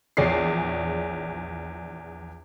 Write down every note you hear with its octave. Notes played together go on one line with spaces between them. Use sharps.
A#1 E2 G#4 C#5 D5 C7